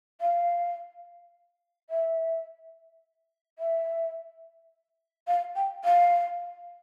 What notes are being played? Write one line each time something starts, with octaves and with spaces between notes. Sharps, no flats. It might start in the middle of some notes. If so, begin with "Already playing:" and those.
F5
E5
E5
F5
G5
F5